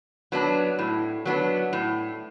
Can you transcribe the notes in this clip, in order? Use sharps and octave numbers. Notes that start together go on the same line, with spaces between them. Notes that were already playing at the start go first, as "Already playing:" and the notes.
F#3 B3 D4
A2
F#3 B3 D4
A2